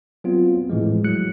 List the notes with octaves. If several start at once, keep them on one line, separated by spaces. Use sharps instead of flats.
F#3 B3 C4 F4
A2 E3 F3 G#3
F#3 F#6 C#7